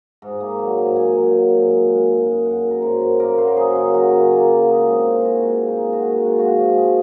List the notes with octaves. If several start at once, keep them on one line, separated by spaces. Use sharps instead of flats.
G#2
A#3
F#3
G#2
A#3 G#5
F#3
F#3
G#2
F#2
G#3
F#2
G#3
F#2 F#5
F#2
A#4
F#2 C5
F#2
A#3 A#4
F#3 C5
A#4
C#3 G#4
C#3
F#3 F#4
C#3
A#3 F4
F#3
G#3 D#4
G#3 C4
A#2 G#4
G#3 F#4
G#3 F4
A#2
D#4
G#3
F#4
A#2
G#3 F#4
F4
G#3 F#4
F3
G#3